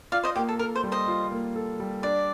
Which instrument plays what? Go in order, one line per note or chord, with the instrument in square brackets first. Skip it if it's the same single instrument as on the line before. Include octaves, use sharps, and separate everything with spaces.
[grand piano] F4 [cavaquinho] D5 F5
[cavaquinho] C5 D#5
[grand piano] A#3 [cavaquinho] G4
[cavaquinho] A4
[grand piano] A4 [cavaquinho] A#4
[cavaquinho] C5
[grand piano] G3
[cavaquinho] C5 D#5
[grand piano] F4
A#3
A4
G3
[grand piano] D4 [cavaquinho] D5